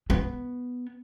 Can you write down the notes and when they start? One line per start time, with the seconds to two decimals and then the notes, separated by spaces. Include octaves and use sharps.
0.10 B3